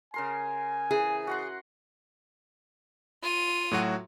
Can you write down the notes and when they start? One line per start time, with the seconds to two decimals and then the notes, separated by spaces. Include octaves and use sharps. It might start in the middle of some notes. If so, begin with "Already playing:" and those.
0.14 C#3 A#4 G#5 C6
0.91 E3 G#4
1.27 F#4 F#5 C6
3.23 F4 D#7
3.71 A2 F#3 F#4